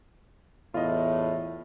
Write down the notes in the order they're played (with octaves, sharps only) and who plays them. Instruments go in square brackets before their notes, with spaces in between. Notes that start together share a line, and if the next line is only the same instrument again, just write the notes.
[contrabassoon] E2 [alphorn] A2 [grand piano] F4 D#5